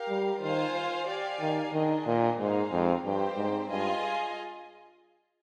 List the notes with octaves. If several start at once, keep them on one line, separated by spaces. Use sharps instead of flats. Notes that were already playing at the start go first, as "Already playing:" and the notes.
Already playing: G4 A#4 F5
G3
D#3 F4 C5 F5 G#5
G4 D5 F5 G#5
D#3
D#3 D4 G#4 D#5 G#5
A#2
G#2 D#4 G#4 C5 F5
F2
G2 C4 G4 C5 G5
G#2
G2 F4 G#4 D#5 G#5